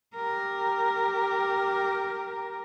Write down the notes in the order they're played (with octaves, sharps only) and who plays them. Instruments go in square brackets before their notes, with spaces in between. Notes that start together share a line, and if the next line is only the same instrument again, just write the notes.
[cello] G4 A#4